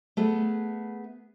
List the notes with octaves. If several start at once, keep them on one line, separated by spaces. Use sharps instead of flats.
A3 B3 G#4 B4